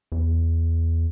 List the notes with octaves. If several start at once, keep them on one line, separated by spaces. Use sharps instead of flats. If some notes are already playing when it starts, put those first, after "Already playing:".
E2